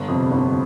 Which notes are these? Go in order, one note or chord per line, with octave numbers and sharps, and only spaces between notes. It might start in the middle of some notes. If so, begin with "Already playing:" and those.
Already playing: G1
F2 C3
G1